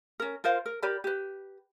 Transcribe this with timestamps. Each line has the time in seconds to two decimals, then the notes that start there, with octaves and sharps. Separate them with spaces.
0.20 C#4 A#4
0.44 F4 A#4 C5 F5
0.66 A#4
0.82 G4 A#4 D5 B5
1.04 G4 B4